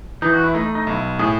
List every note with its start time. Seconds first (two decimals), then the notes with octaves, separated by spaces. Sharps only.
0.22 E3 D#4
0.33 F#4
0.44 E4
0.54 A3 D#4
0.75 D#4
0.87 B1 E4
1.19 A2 G#4